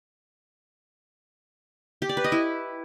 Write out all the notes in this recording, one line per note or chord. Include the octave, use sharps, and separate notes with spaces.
G4
D5
B4
D#5
E4